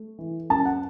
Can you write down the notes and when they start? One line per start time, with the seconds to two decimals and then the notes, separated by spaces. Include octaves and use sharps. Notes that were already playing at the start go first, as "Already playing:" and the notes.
Already playing: A3
0.19 E3
0.50 F#2 A5
0.65 F#5